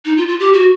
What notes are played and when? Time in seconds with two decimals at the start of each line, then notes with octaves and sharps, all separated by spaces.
0.05 D#4
0.17 F4
0.28 F4
0.40 G4
0.53 F#4